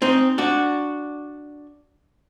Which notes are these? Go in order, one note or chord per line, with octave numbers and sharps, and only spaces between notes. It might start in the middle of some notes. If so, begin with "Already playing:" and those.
C4 D#4
D4 F#4